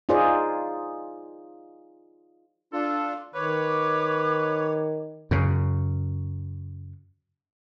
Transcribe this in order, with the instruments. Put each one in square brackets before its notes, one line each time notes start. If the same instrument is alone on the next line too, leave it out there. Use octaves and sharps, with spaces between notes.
[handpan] D#4 F4 G#4 C5 D5 D#5
[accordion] D4 F4 [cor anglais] A4
[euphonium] D#3 [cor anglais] B4 [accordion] C#5 [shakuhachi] D6
[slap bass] F#2 C#3